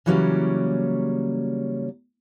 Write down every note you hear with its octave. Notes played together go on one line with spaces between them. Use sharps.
C#3 E3 F#3 G3 A#3 C#4